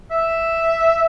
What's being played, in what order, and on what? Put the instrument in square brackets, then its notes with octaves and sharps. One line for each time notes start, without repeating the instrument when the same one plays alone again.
[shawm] E5